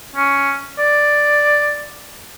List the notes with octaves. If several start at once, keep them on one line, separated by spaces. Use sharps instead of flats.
C#4
D5